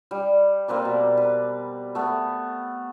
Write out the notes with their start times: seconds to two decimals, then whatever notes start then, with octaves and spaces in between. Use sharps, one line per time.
0.11 G3
0.68 A#3 C4 B4 D5
0.85 B2
1.17 B4
1.95 A3 B3